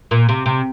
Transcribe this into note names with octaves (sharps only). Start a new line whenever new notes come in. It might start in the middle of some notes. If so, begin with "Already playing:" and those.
A#2
C3
C3